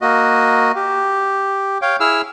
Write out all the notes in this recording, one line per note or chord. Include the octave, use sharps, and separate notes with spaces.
A#3 F#4 D#5
G4
C#5 F5 G5
E4 G#4 E6 F6